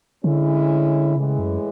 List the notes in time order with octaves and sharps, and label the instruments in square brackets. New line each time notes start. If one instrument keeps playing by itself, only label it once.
[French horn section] A2 G#3 C#4 E4 [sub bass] D3
[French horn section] A2 E3 G#3 [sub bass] C#3
[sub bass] F#2